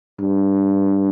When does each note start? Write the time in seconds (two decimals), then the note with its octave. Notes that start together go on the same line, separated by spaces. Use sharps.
0.20 G2